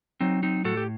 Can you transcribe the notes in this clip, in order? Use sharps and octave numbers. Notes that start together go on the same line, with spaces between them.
F#3 C4 D#4
C4 D#4
A2 F#4 A4
G4